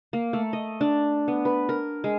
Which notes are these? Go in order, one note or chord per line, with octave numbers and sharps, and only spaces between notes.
A#3
A3
D#5
D4
B3
B4
A#4
G#3